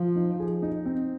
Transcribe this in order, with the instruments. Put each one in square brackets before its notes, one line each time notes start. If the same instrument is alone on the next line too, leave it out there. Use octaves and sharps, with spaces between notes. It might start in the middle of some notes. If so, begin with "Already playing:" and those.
Already playing: [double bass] F3
[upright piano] D#4
G#4
D#4
C4